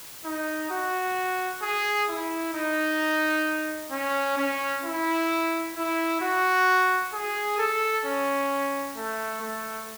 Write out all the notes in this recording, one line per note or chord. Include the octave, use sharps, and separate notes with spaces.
D#4
F#4
G#4
E4
D#4
C#4
C#4
E4
E4
F#4
G#4
A4
C#4
A3
A3